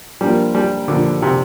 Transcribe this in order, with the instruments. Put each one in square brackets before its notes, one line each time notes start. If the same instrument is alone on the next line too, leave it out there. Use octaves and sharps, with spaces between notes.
[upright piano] F3 A#3 D4 F4 A#4 [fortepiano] G3
[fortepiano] G3
[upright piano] A#2 F3 A#3 D4 [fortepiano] D3
[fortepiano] C3